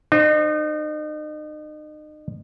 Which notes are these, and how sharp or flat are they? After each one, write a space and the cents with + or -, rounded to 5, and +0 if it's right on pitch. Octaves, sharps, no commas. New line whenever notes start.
D#4 -35 C5 +10